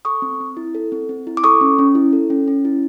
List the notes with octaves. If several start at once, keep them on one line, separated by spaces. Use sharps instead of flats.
A4 C#6 D#6
C4
C4
E4
A4
C4
C4
E4
D6
A4 C#6 D#6
C#4
C#4
E4
A4
C#4
C#4
E4